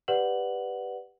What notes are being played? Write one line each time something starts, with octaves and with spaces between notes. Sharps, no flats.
G4 B4 D5 F#5 F#7